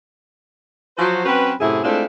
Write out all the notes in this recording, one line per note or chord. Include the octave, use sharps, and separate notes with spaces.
F3 F#3 F#4 C5
F#3 C4 C#4 B4
F#2 A2 C3 E4 G#4
G#3 A3 C4 D4 E4 F4